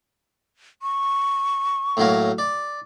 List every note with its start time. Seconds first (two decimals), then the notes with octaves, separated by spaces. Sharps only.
0.82 C#6
1.97 A2 F#3 A#3
2.38 D5